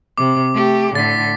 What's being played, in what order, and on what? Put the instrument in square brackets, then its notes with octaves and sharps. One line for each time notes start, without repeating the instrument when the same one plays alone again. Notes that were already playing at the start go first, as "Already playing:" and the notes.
[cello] C3 [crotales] D6
[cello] A3 G4
[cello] A2 D3 [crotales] A6 B6